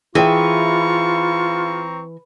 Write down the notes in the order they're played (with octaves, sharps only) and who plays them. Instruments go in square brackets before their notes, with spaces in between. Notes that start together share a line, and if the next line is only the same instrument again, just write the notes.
[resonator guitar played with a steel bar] E3 [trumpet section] C4 A#5 C#6 [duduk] F4 [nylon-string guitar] G#4 E5 G5